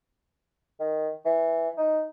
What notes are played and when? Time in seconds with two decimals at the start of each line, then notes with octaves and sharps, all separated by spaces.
0.80 D#3
1.25 E3
1.77 D#4